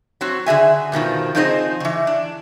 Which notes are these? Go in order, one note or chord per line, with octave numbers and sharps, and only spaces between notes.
F#3 C4 F#4
D3 G#4 E5 G#5
G2 B2 D#3 F3
F3 C4 D#4 G#4 C5 D#5
D#3 E3
D4